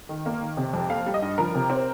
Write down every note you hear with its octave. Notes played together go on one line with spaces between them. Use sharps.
D#3
A#3
D#3
C3
F2
A#3 F5
G3
D#5
G2
F3 A#4
C3
C4